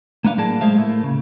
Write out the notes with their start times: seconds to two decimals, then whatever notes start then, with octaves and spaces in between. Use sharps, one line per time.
0.24 A#3 B3 D4 F5
0.37 A2 F#3 A#3 D4 G#4 A5
0.61 G#3 A3 G#4 C5 E5 F5
0.78 A2 A3 A#3
1.04 C#3